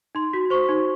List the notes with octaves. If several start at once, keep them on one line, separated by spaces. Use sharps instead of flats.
D#4 C6
F#4
C5 C#6
D#4